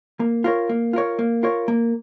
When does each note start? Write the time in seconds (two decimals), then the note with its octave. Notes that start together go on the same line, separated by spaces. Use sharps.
0.20 A#3
0.44 F4 A#4 C#5
0.69 A#3
0.93 F4 A#4 C#5
1.19 A#3
1.43 F4 A#4 C#5
1.68 A#3